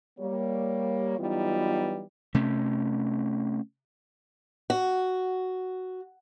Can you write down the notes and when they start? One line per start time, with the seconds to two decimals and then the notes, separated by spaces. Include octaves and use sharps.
0.20 G3 A#3 C#5
1.19 E3 F#3 G3 B3 D#4 F4
2.34 C3 A3 C#4
4.70 F#4